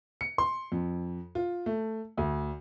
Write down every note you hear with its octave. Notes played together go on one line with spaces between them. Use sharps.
C#7
C6
F2
F4
A3
D2